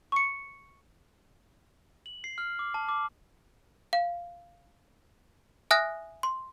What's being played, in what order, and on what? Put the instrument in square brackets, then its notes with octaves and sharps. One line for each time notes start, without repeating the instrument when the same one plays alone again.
[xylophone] C#6 C#7
[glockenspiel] F#7
C7
F6
D6
A5
D6
[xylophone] F5
E5 G#5 D#6 F6 F#6 A#6
C6